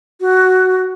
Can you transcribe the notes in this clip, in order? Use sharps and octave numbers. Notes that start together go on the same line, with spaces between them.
F#4